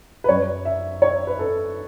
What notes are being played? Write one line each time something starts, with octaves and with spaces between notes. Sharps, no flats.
B4
F#2 F#3 C#5
E5
C#5
B4
A4